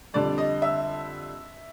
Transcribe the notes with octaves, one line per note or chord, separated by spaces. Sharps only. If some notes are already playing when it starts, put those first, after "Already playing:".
F2 D3 G3 D5
D#5
E5